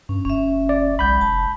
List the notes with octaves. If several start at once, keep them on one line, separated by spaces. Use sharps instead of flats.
G2 C#4
F#1 C#4 E5
D5
B1 G#3 F#5 B5 G6
F1 A5